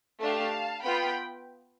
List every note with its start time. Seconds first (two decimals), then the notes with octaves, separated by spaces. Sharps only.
0.21 A3 D4 G4 F5 A5
0.84 B3 F4 G5 B5